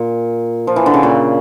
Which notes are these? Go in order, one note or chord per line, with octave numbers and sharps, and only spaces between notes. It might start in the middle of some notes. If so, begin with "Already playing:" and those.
Already playing: A#2
F3
E3
D3
C#3
A#2